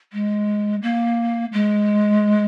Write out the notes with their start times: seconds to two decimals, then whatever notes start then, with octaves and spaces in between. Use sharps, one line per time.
0.13 G#3
0.82 A#3
1.53 G#3